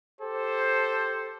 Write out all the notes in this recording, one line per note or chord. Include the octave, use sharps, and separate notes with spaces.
G4 A4 C5